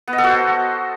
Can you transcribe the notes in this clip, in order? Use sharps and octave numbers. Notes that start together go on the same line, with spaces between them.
B3
D#5
A4
F#4
C5